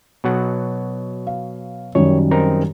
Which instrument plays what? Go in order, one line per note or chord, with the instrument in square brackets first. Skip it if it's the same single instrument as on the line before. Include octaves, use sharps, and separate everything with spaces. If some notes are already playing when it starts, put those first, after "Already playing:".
[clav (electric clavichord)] B2 F#3 F#5
[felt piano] F5
[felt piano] F#2 D#3 G3 [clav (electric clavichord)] C#5
[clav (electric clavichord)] C4 D#4 A#4